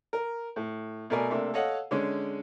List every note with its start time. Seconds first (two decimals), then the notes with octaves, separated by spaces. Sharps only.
0.13 A#4
0.56 A2
1.10 B2 A3 A#4 D5 G#5
1.30 C3 A3 A#3 D4
1.54 A4 C#5 D#5 F5 F#5
1.91 D3 G#3 C#4 D4